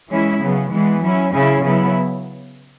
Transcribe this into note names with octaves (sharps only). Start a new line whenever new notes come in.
E3 G#3 C#4 E4
C#3 F#3 B3
E3 G#3 B3
F#3 C#4 E4
C#3 F#3 C#4 E4
C#3 F#3 B3 E4